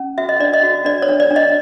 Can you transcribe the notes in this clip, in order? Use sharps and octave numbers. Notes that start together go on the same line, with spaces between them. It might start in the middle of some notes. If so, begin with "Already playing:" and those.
Already playing: C#4
F#4 E5
D#5
D4 D5
D#5
F#4
D4 D5
C#5
D4
D5
D4
D#5